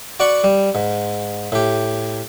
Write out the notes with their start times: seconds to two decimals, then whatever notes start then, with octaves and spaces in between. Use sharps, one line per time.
0.20 F#4 D5 F#5 B5 C#6
0.44 G3
0.75 G#2
1.52 A2 G4